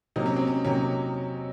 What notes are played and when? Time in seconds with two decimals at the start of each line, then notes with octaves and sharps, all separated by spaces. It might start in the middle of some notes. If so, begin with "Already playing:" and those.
0.16 C3 F#3 A#3 D#4
0.26 C#4
0.36 C4
0.47 C#4
0.65 C3 F#3 A#3 C#4